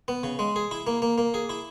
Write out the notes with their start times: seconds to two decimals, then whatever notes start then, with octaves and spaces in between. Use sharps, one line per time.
0.08 B3
0.23 C#3
0.39 G#3
0.56 G#4
0.71 E4
0.87 A#3
1.02 A#3
1.18 A#3
1.34 G#4
1.50 E4